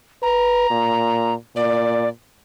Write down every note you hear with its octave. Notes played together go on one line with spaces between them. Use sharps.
B4 A#5
A#2
A#2 D5